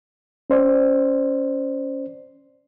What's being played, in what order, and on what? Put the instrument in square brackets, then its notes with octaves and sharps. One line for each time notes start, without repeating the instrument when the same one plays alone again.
[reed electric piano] C#4 C5 D5